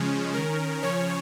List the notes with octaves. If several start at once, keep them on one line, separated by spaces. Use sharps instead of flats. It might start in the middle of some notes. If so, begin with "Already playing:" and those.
Already playing: C#3 F3 G#3 C#4
D#3 C#4 A#4
C#3 F3 C#4 C#5